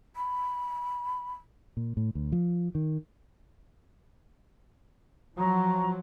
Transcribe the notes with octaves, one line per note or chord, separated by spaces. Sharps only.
B5
A#2
A2
D2
F3
D#3
F3 F#3 A#5 C#6